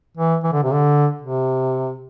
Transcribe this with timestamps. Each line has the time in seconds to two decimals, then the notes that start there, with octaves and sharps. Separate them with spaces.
0.17 E3
0.43 E3
0.53 D3
0.64 C3
0.73 D3
1.22 C3